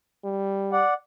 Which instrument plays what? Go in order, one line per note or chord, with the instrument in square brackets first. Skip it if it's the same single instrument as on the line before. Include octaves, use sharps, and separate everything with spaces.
[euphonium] G3
[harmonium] D5 F#5